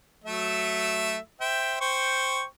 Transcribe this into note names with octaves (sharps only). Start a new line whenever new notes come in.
F#3 A3 E5
C5 E5 G5
C5 G5 C#6